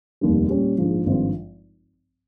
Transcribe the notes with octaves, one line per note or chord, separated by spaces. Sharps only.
F1 D#2 D#3 G3
A#2 G3 C#4 G4
A#1 G#2 F3
G#1 G2 F3 C4 F4